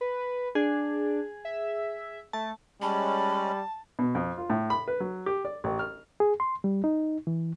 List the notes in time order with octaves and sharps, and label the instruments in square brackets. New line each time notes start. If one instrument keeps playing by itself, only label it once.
[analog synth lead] B4
[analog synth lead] D4 [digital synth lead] G#4
[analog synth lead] E5
[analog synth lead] A3 [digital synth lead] A5
[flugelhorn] G3 [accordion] G#3 C#4 [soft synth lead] A5 [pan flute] B5
[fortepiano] B2
F2
F4
A2
B5
B4
F#3
G4
D5
A1
F6
[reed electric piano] G#4
C6
G3
D#4
E3